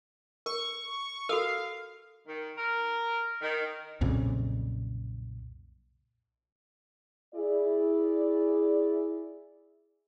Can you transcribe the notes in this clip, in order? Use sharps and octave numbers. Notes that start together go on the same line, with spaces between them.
A#4 C#6
F#4 A4 A#4 F5
D#3
A#4
D#3
B1 F2 A#2 C#3
E4 G#4 D5